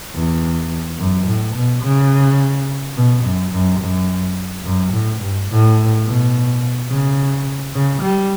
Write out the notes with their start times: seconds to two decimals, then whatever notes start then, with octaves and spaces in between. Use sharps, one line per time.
0.15 E2
0.99 F#2
1.27 A2
1.55 B2
1.83 C#3
2.96 B2
3.24 F#2
3.52 F#2
3.80 F#2
4.65 F#2
4.93 A2
5.21 G2
5.50 A2
6.05 B2
6.90 C#3
7.74 C#3
8.02 G3